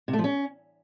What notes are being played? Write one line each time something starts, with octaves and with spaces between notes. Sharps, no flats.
C3
A3
F3
C#4